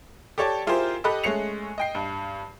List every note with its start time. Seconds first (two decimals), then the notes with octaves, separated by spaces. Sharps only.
0.38 G4 A4 C#5 D5 A5
0.67 E4 F4 G4 G#4 A#4 C5
1.04 G4 A4 D#5 B5 F#6
1.24 G#3 A3 C#4 C7 C#7 F7
1.78 D#5 G5 C7
1.95 G2